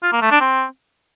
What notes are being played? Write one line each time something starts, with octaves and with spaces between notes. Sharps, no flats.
F4
A#3
A3
D4
C4